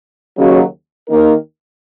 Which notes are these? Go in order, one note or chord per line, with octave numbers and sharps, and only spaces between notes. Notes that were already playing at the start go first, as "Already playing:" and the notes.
D#2 C#3 F#3
D#2 D#3 A#3 D#4 A#4